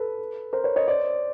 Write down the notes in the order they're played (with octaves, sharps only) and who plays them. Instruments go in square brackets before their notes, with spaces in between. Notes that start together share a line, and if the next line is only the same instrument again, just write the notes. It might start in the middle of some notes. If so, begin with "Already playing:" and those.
Already playing: [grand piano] A4 B4
A#4 C5
B4 C#5
C#5 D#5
C5 D5